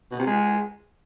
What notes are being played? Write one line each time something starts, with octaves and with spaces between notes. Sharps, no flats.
B2
C3
G#3